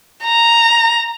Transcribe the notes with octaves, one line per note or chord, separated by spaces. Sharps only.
A#5